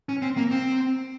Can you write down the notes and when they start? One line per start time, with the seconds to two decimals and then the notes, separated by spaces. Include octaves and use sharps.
0.09 C#4
0.22 C4
0.37 A#3
0.51 C4